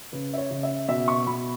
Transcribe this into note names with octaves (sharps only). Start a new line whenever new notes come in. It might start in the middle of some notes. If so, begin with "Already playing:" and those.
C#3 B4
E5
C#5
C#3
E5
B2 E5
C#6
B2 B5